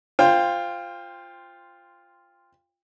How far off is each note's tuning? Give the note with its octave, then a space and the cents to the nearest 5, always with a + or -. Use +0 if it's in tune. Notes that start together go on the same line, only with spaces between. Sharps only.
F4 +0 C5 -5 G5 +25